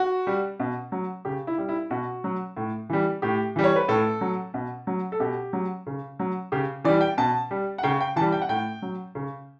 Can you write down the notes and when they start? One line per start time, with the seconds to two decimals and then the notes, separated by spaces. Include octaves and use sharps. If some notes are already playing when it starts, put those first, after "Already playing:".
Already playing: F#4
0.27 G3
0.60 B2
0.92 F#3
1.25 C#3 G4
1.47 E4
1.58 G3
1.69 E4
1.91 B2 F#4
2.24 F#3
2.57 A2
2.90 E3 G3
3.22 A2 G4
3.56 E3 G3
3.64 C#5
3.76 B4
3.88 A2 A4
4.21 F#3
4.54 B2
4.87 F#3
5.12 A4
5.20 B2 G4
5.53 F#3
5.87 C#3
6.20 F#3
6.52 C#3 G4
6.84 E3 D5
6.88 G3
7.01 G5
7.18 B2 A5
7.51 G3
7.78 F#5
7.83 C#3 G5
8.01 G5
8.16 E3 A5
8.21 G3
8.32 G5
8.42 F#5
8.49 A2 G5
8.82 F#3
9.15 C#3